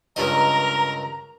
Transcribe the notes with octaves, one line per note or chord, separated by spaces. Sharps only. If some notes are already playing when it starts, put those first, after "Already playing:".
C#2 G2 A#4 D#5 A#5